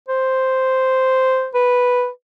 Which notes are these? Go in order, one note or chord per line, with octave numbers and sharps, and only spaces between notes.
C5
B4